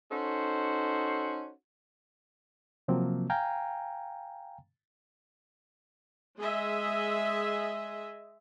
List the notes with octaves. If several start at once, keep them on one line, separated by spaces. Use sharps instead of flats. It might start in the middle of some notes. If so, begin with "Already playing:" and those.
C#4 D#4 F#4 A4 C5
C3 F3 F#3 A#3 C4
F5 G5 G#5 A#5
G#3 G#4 D#5 E5